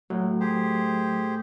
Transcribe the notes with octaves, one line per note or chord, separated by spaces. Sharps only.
A2 F#3
G4 G#4 C5